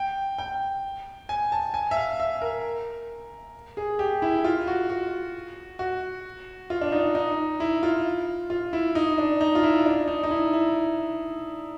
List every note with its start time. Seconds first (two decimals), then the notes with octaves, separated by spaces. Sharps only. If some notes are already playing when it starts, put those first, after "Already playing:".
Already playing: G5
0.38 G5
1.29 G#5
1.52 A5
1.74 G#5
1.91 E5
1.97 F5
2.20 E5
2.42 A#4
3.77 G#4
3.99 G4
4.22 E4
4.44 F4
4.67 F#4
4.90 F#4
5.79 F#4
6.70 F4
6.81 D4
6.92 D#4
7.15 D#4
7.60 E4
7.83 F4
8.50 F4
8.73 E4
8.95 D#4
9.18 D4
9.41 D#4
9.55 F4
9.63 E4
9.86 D4
10.08 D#4
10.24 D#4
10.31 E4
10.53 E4